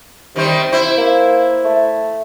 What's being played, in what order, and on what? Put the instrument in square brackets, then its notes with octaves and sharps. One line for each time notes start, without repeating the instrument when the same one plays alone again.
[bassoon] C3 [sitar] D#3 G3 C5
[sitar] E4 C5
[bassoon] A#3
A3